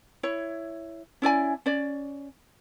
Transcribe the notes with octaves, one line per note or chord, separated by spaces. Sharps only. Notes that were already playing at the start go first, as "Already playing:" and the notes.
E4 C#5
C#4 E4 D5 G#5
C#4 D5